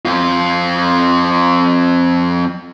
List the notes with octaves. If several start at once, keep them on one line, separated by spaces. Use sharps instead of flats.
F2 F4